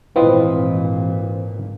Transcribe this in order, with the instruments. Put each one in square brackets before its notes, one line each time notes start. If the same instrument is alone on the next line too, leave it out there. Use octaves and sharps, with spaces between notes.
[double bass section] G#1 A#2 [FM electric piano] E3 C4 [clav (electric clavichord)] F4 B4 D#5